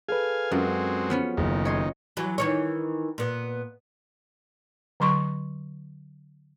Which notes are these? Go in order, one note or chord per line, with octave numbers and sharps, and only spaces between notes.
G#4 A4 B4 F5 G#5
F#2 F#3 G#3 C4 F4
F3 B3 C#4
F#1 D#3
C#5 D#5 C6
E3 F#3
D#3 E3 C#5
A#2 B3
D3 F#3 C6 C#6